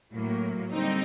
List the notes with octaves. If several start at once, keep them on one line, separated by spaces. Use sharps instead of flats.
A2 F#3 A#3
D3 G3 C4 D#4